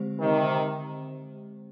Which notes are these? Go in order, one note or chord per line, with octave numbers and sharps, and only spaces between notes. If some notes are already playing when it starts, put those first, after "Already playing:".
Already playing: D3 G#3 C4 G4 C5
C3 D#3